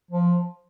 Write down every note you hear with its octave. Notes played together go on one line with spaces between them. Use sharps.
F3